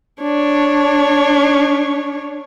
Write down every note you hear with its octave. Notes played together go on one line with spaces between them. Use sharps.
D4 C#5